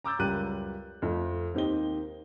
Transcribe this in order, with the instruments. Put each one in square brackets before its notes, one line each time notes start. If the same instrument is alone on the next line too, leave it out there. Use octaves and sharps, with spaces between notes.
[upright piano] A#5 D6 E6 G6 A6
C#2 F#2 G3 G4 F#6 D#7
F2 A3
D#2 D#3 C4 G4 D#5 G7